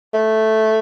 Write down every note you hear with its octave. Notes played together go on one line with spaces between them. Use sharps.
A3